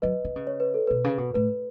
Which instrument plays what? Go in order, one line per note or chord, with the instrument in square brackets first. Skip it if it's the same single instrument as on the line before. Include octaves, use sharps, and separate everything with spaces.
[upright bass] F#3 [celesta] B4 D#5
[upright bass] D#3
C#3
[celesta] C#5
B4
A4
[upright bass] B2 [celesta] B4
[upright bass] C#3
B2
[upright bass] A2 [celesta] B4
[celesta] B4